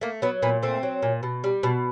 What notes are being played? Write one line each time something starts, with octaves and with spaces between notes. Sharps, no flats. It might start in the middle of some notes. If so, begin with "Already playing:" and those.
A3 A#3
F#3 B3
A#2 B3
A3 C4
F#3
A#2
B2
G3
B2